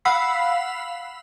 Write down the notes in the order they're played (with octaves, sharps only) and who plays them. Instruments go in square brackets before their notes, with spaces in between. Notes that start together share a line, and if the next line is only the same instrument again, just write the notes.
[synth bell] F5 F#5 B5 E6 B6 C7